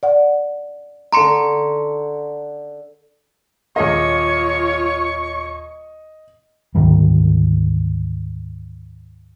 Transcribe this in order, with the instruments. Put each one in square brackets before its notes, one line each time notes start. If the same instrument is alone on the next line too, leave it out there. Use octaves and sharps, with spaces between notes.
[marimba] D5 F#5
[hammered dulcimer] D3 C#6 [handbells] A#5 C6 C#7
[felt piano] D#1 G#4 A#4 [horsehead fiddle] F4 C#5 [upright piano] D#5 [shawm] C#6
[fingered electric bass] D2 G#2 D#3 G3